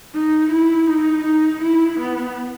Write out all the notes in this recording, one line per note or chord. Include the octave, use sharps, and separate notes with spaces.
D#4
E4
D#4
D#4
E4
B3